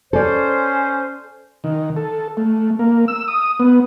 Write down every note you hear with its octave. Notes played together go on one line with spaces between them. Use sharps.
C#4 A4 C5 D5
D#3
A4
A3
A#3
E6
D#6
B3